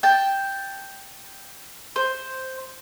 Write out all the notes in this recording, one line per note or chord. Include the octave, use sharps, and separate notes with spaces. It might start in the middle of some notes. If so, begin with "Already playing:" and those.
G5 A5
C5